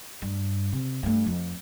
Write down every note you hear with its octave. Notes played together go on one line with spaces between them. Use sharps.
G2
C3
G2 A3
F2